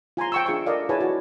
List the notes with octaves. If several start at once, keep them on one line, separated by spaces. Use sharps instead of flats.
F4 G#5 A#5 C6
G5 C#6 E6
D4 F4 G#4 E5 C#6
A4 A#4 D5 D#5 F5
E4 G#4 B4 C#5 G#5 A5
F#4